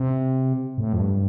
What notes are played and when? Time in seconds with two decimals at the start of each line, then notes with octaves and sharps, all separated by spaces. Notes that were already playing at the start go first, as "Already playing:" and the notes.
Already playing: C3
0.78 A2
0.93 F2
1.00 G2